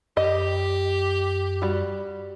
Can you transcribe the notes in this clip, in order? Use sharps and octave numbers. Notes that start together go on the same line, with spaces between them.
F#2 G4 D#5
G3 F#4